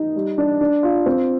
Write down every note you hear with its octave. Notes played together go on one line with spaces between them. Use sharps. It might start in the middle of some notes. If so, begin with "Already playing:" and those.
Already playing: D#4
G3
D4
D4
F4
C4